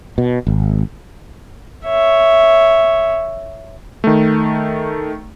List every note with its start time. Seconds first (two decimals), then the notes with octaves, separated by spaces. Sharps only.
0.18 B2
0.47 G#1
1.85 C#5 E5
4.04 D#3 A3